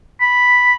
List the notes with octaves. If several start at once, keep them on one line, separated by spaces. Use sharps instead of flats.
B5